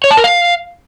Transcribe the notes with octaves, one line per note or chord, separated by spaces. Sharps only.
C#5
A5
A#4
F5